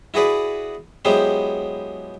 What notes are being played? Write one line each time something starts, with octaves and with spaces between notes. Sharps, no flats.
E4 F#4 G#4 B4 D5
F#3 G#3 B3 E4 G4 C5